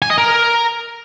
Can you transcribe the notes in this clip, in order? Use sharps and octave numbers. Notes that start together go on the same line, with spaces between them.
G#5
D#5
A#4